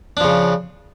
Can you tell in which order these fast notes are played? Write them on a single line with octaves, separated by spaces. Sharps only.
D4 F3 C#3